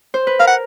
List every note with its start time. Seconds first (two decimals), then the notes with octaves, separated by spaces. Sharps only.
0.14 C5
0.27 B4
0.40 A#4 F5
0.47 F#5